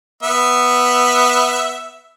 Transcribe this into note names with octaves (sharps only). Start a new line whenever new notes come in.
B3 E5